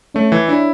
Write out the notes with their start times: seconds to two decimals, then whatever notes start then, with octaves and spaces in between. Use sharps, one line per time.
0.14 A3 C#4 C#5
0.32 E3
0.48 D4 E4 D5